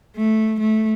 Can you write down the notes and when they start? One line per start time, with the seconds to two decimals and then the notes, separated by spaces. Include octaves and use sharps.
0.16 A3
0.60 A3